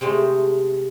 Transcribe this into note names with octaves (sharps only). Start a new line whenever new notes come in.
C3 G#3 A3 C4